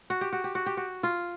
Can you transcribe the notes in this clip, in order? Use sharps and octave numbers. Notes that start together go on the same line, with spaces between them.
F#4
G4
F#4
G4
F#4
G4
F#4
F4